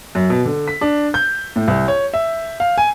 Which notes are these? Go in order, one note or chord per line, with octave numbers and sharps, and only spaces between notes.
F#2
B2
D3
B6
D4
G6
A2
C2
C#5
E5
F5
G#5